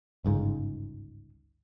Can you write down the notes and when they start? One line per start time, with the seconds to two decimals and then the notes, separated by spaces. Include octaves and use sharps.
0.25 G1 C#2 G#2